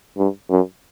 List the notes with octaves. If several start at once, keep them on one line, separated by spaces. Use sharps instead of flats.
G2
F#2